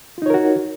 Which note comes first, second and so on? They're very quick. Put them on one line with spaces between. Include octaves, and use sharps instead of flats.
F4 D#4 C#5 A#4 F#4